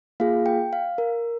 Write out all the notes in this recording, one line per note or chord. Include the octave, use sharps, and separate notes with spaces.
A#3 F4 G#4 F5
G5
F5
A#4